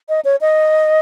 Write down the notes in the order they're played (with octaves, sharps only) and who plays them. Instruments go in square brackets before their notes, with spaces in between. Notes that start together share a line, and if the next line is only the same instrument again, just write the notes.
[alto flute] D#5
C#5
D#5